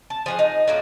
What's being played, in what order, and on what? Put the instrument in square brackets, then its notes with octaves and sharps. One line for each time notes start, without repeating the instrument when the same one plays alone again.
[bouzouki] A5
F3 G#4 F#5
D#4
A2 F#3 A#3